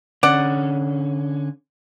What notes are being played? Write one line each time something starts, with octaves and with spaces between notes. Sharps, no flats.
D3 C#4 D5 F#5